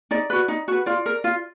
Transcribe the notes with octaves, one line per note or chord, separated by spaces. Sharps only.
D#4 D5
F#4 B4
D#4
F#4 B4
F4 D5
A#4
F4